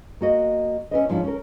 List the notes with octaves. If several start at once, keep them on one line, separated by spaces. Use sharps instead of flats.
A#3 F#4 D#5
C#4 D#4 E4 B4 C5 D#5
G#2 F3 C#4 D4 E4
C#4 A#4